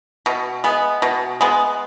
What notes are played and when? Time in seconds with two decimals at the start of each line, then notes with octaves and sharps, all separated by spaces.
0.26 B2
0.64 G#3 B3
1.02 B2
1.41 G#3 B3